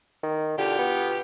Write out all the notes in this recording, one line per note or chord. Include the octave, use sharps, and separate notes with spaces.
D#3
B2 D3 F4 G4
B3